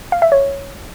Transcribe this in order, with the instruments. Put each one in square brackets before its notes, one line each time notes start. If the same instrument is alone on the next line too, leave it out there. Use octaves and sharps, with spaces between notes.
[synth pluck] F5
E5
C#5